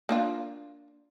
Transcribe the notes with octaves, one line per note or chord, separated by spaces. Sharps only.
A#3 D4 F4